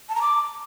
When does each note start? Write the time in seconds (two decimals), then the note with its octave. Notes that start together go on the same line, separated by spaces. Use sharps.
0.09 A5
0.15 A#5
0.22 D6